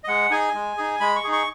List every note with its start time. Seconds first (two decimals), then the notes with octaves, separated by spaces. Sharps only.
0.04 D#5
0.08 G#3 F#5
0.30 D#4 G#4 G#5
0.54 G#3
0.77 D#4 G#4
1.00 G#3 B5
1.16 C#6
1.24 D#4 G#4
1.32 C#6